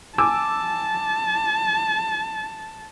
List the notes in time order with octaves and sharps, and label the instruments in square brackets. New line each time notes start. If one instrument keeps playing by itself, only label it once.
[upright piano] G#5 D6 E6 [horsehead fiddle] A5